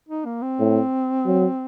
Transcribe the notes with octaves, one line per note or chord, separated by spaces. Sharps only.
D#4
A#3
C4
A2
F#3